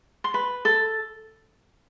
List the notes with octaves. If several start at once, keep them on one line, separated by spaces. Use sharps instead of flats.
C6
B4 B5
A4 A5